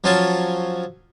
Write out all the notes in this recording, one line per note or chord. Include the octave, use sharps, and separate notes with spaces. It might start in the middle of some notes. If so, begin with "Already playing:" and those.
F3 F#3 C#4 F4 A5